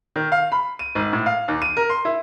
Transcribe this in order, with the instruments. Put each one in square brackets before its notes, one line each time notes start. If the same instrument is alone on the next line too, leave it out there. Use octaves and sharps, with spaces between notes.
[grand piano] D#3
F5
B5
D#7
G#1
A2
F5
D#2
D#7
A#4
C6
E4